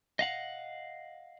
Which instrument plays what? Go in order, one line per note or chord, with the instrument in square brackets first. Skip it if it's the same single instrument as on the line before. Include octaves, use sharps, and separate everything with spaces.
[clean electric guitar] D#5 F5 F#5